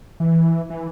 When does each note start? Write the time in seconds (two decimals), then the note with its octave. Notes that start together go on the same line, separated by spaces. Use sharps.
0.20 E3
0.70 E3